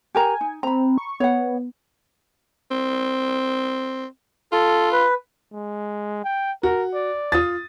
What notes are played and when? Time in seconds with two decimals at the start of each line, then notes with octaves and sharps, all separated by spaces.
0.15 G4 A#4 G#5 A#5
0.41 D#4
0.63 C4 A#5 B5
0.98 C#6
1.20 B3 C#5 F#5
2.71 C4
4.52 F4 A4
4.92 B4
5.52 G#3
6.24 G5
6.63 F#4 A#4
6.94 D5
7.32 F4 D#6 A6